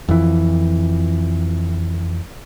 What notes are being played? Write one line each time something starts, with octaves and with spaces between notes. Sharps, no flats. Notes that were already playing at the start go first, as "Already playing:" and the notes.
F2 E3